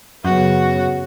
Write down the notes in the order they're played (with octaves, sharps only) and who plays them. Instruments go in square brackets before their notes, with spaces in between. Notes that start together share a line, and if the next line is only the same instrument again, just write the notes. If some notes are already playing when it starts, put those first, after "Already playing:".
[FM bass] F#2 [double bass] C#3 B3 [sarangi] F#4